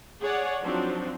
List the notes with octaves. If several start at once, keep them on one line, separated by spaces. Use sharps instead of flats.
G#4 C#5 D5 F#5
F3 F#3 C4 D4 D#4